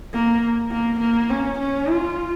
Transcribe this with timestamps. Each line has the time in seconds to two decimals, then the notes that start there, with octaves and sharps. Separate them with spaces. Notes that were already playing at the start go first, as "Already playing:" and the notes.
0.13 A#3
0.71 A#3
1.00 A#3
1.30 C#4
1.59 C#4
1.89 F4